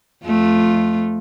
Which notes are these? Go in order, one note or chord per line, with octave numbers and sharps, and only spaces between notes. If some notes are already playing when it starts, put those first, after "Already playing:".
F2 A3 F4